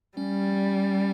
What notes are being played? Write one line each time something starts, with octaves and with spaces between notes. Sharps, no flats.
G3 C#4